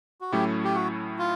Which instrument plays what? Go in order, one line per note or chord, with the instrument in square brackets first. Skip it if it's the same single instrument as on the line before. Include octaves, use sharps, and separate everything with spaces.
[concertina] F#4
[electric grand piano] A2 F#3 A3 C#4 E4 [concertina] G4
[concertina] G4
F#4
F4